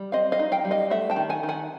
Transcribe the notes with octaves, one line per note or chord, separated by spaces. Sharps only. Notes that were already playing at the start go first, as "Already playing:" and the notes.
Already playing: G3
C4 D#5 F5
D#5 F5
D#4
F5 G5
G3
D#5 F5
A3 E5 F#5
G5 A5
D#3
F#5 G#5
D#3
F#5 G#5